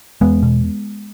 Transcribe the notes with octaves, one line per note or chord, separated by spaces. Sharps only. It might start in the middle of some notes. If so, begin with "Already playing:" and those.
E2 G#3 B3
B2